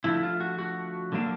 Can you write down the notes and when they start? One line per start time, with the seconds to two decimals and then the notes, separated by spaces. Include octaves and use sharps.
0.04 D3 F3 A3 E4
0.23 F4
0.40 F#4
0.59 F#4
1.12 D3 F#3 A#3 D4